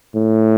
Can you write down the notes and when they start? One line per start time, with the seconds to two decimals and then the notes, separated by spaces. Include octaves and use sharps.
0.15 A2